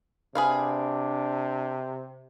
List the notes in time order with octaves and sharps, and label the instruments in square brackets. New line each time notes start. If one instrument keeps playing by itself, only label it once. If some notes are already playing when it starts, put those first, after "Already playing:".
[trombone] C3 [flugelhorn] D4 [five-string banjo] G#4 B4 F5